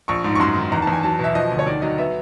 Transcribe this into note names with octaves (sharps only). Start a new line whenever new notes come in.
A#1 C#6
G#2
C#6
F#2 C6
D#3
E2 A#5
A5
E2
G#5
F#3 A5
B2 E5
F3 D#5
D2
C#5
D#3 D5
F#3 D#5
B3 E5